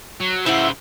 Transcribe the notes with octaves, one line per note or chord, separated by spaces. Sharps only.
F#3
C#3 E4 C5 E5 F#5